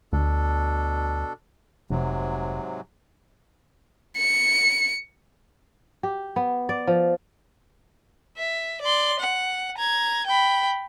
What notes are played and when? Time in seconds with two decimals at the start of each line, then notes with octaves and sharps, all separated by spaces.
0.13 D2 B2 D4 A4
1.90 F1 G#2 C3 F#3
4.18 C#7
6.03 G4
6.36 B3
6.69 D5
6.87 F3
8.37 E5
8.82 D5 C6
9.19 F#5
9.78 A#5 G#6
10.27 G5 B5